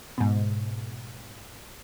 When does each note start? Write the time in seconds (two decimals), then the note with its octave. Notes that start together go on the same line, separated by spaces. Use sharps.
0.18 G#2 B2